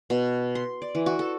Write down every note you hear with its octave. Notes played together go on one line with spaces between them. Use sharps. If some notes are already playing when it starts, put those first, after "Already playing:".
B2
C6
D5
E3
F#4
A4